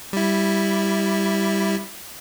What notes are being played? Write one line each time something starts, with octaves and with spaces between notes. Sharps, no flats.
G3 E4